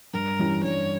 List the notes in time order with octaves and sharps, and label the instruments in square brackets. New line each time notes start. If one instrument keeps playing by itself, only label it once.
[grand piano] G2 [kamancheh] A#4
[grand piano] E3 G3 C#4 E4
[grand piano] G2 [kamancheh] C#5